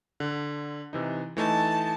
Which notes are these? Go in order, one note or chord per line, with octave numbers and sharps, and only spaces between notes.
D3
C3 E3 D#4
E3 A3 D#4 A5